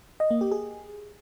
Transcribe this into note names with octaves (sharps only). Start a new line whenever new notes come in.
D#5
A#3
G4
G#4